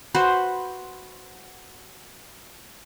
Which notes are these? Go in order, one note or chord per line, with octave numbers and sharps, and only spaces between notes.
F#4 B4 C5